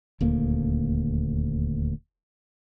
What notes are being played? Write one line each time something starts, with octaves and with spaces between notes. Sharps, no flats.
D#1 D2 A#3